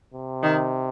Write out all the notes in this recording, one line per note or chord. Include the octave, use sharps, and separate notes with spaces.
C3
D#3